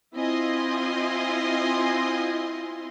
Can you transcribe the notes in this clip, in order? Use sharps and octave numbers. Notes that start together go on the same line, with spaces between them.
C4 E4 F4 D#5 G#5 C6